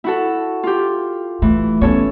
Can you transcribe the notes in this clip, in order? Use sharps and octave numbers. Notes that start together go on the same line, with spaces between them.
E4 F#4 A4
F4 G4
E3 A3
B3 C#4 A4 C#5